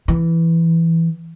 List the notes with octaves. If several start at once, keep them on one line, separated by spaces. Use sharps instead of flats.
E3